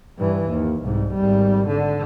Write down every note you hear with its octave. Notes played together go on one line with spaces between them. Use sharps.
G2 E3
D#2
C2 G#2
G#1 G3
D3